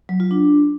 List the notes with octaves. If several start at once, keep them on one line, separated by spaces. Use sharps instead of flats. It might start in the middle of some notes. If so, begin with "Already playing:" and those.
F#3
F4
D4